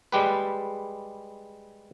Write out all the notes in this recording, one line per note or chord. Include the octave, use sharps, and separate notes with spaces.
G3 G#3 G4 B4